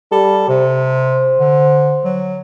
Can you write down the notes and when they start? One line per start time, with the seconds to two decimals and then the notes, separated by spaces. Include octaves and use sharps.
0.12 G3 A4
0.49 C3 C5
1.39 D3
2.05 F#3